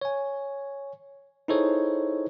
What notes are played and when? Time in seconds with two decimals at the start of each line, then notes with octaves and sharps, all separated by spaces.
0.01 C#5 G#5
1.48 D#4 E4 G#4 A4 C5 C#5